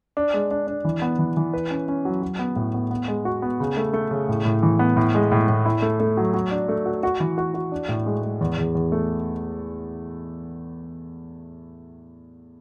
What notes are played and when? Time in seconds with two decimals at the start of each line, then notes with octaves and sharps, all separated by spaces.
0.17 D4
0.34 G#3
0.51 D4
0.67 D4
0.85 E3
1.02 B3
1.19 E3
1.37 E3
1.53 B4
1.71 C#4
1.88 C#4
2.05 F#3
2.23 F#3
2.39 B3
2.56 A2
2.74 B3
2.91 B3
3.08 G#3
3.25 F#4
3.42 B3
3.60 C#3
3.77 A3
3.93 A3
4.11 C#3
4.29 A2
4.45 A2
4.63 E3
4.79 B3
4.97 A2
5.15 G#3
5.32 A2
5.49 A2
5.65 E4
5.82 A3
6.00 A3
6.17 F#3
6.34 F#3
6.51 D4
6.68 A3
6.86 F#4
7.03 F#4
7.20 E3
7.38 F#4
7.54 F#4
7.72 D4
7.89 A2
8.06 G#3
8.23 G#3
8.41 E2
8.58 E2
8.75 E2
8.92 A3